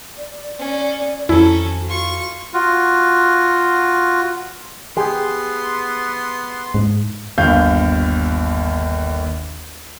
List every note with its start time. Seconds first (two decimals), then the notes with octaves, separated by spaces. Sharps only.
0.18 D5
0.59 C#4
1.29 F2 D#3 E3 C#4 E4 F#4 A4
1.86 F4 C#6
2.54 F4 F#4
4.97 B3 G4 G#4 C6
6.74 G#2
7.38 G1 D#2 F5 G6